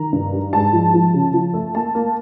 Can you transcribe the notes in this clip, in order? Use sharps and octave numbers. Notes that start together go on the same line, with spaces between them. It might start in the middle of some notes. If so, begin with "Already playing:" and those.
Already playing: D#3 A#5
G2
G3
G#2 A5
F3
F3
C#3
F3
A3
A#3 A5
A#3